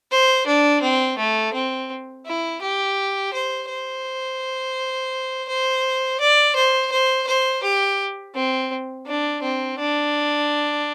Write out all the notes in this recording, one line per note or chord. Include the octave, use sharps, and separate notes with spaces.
C5
D4
C4
A3
C4
E4
G4
C5
C5
C5
D5
C5
C5
C5
G4
C4
D4
C4
D4